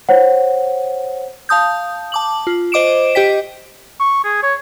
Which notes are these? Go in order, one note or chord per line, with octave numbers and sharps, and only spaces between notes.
C5 C#5 F#5
F5 A5 D#6 G6
A5 D6 F#7
F4
C5 D#5 D6 D7 E7
G4 D#5 G5 B6
C#6
G#4
C#5